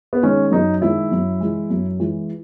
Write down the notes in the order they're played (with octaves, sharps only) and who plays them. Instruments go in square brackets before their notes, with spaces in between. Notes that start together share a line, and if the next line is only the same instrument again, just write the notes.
[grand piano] B3
D#3 G#3 C#4
F#2 D#4
D#3 G#3 E4
F#2
E3 G#3
F#2
E3 G#3